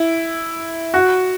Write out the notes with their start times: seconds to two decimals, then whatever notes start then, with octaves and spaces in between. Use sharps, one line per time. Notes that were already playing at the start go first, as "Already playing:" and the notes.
Already playing: E4
0.94 F#4